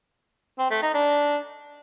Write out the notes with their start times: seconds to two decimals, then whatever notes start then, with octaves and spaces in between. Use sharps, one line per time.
0.59 C4
0.71 A3
0.82 D#4
0.94 D4